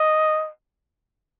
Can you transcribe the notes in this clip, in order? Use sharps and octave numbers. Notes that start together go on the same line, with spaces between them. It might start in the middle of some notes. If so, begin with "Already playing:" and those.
Already playing: D#5